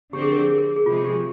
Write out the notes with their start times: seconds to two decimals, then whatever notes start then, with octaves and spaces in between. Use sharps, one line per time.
0.13 D3 F3 C4 G4
0.22 G#4
0.32 A#4
0.40 G#4
0.50 G#4
0.58 A#4
0.76 G#4
0.86 C3 F3 G#3 F4
1.04 G4